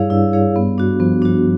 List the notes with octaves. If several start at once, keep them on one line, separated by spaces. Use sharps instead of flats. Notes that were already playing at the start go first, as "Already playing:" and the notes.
Already playing: G2 G3 E4 G#4 C#5 F5
G2 G3 E4
G#4 C#5 F5
B3
D4 F#4
F3 B3
D4 F#4